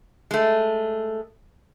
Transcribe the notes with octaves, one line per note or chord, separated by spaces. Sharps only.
G#3 A3